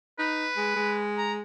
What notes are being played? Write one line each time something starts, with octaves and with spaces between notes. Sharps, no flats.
D#4 B4
G#3
G#3
A#5